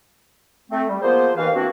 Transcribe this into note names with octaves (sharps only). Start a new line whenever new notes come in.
A3 C4
G3
F3 A#3 B3 G#4 C5
D#2 E3 B4 F5
E3 A#3 C4 D4 F#4